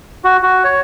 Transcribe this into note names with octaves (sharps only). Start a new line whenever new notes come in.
F#4
F#4
C#5